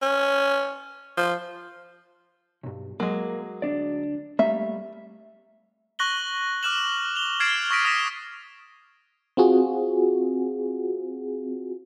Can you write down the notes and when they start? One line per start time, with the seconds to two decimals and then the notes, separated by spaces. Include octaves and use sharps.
0.02 C#4
1.18 F3
2.63 B1 G2
3.00 F#3 G#3 A#3
3.62 D2 D4 D5
4.39 G3 A3 A#3 E5
5.99 C#6 F#6 A#6 F#7 G7
6.63 D6 F6 F#6 E7 F#7
7.15 F7 G7
7.40 F6 G#6 A6 C7 D7 E7
7.71 C#6 D#6 A#6 B6 D7 D#7
7.85 D#6 F6 A#6 B6 E7
9.37 C4 F4 F#4 G#4